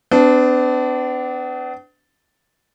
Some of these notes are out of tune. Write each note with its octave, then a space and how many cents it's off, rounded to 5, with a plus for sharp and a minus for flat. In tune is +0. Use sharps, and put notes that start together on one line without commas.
B3 +45 D4 -5